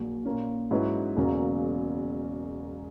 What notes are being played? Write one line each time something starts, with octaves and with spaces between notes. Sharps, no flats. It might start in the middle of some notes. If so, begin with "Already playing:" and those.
Already playing: A#1 A#2 F#3
A#2 A#3 C#4
G#2 F#3 C#4 E4 B4
E1 E2 C#3 F#3 A#3